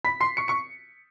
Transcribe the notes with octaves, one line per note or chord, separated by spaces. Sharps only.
B5 B6
C6 C7
C#6 C#7
C#6 C#7